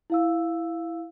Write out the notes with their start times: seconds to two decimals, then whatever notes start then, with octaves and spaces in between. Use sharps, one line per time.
0.10 E4 F5 E6